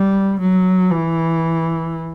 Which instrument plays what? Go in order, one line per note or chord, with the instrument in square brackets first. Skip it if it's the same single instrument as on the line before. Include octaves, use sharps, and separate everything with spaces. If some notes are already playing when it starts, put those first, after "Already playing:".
Already playing: [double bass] G3
F#3
E3